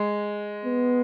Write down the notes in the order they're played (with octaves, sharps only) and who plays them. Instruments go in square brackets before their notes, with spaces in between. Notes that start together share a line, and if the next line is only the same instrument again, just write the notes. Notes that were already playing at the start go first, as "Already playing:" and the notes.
Already playing: [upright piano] G#3
[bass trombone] B3